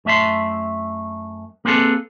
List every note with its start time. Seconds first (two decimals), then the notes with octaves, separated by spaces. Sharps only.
0.05 F#2 A3 E5 A5 C6
1.65 A#3 C4 G#4 A4 B4